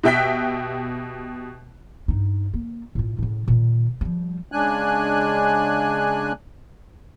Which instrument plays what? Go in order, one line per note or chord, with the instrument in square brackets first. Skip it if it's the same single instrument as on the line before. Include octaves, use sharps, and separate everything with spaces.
[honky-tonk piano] B2 G4 E5 G5 F#6 B6
[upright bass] G2 D#4
A#3
A2 F4
A2 C#3
A#2 D#3
F3 G3
[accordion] C#3 G#3 D4 G#5 F#6